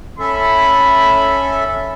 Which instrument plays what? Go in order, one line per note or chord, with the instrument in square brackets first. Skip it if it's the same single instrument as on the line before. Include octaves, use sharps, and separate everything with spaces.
[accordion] C#4 A4 E5 [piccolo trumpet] B5